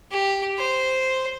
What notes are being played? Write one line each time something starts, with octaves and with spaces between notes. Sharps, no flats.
G4
C5